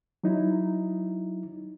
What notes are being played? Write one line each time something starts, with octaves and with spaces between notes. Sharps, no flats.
F#3 D#4 E4